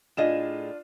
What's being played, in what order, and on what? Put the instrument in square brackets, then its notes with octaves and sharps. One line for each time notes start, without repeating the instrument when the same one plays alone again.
[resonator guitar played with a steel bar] A2 G#4 D#5 [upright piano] D4 F4 E7